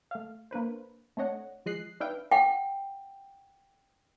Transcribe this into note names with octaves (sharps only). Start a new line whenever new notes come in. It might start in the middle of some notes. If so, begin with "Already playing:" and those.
A3 F5
A#3 D4 B4 C5
A3 C4 D4 C#5 D#5 F#5
F3 G#3 D#5 F#6 C7
D4 D#4 B4 E5 F5 G5
F#5 G5